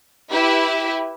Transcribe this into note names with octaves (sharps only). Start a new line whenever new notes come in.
E4 G4 B4 E5